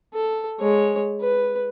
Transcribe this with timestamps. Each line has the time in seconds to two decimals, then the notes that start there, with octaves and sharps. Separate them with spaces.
0.13 A4
0.60 G#3 C#5
1.20 B4